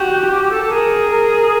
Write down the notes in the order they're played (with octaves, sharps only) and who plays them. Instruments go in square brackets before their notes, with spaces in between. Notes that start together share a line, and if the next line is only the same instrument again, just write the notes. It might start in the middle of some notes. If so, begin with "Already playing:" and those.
Already playing: [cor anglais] F#4 [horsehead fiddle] G4
[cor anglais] G4
G4
A4
A4
[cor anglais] G#4 [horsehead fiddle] A#4
[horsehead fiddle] A#4